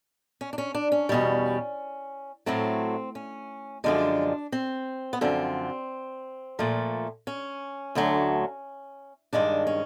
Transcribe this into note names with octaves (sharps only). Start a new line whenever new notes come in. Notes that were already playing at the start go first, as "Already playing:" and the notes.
C#4
D4
C#4
D4
C#4
E2 B2 G3
A2 F#3 A3 C4
C#4
F#2 D3 F3 G#3 D4
C4
B3
F#2 D3 F3 C4
A#2 F3 A3
C#4
D2 D3 F#3 A3
G2 D#3 G#3 D4
C#4